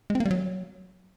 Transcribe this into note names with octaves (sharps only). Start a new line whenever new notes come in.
G#3
C4
A#3
G3
F#3